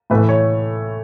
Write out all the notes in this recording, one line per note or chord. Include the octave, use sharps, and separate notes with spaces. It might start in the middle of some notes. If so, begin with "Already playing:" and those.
A2 E3 A3 B4
C#5